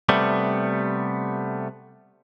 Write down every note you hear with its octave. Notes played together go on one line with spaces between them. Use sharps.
C3 G3 A3 B3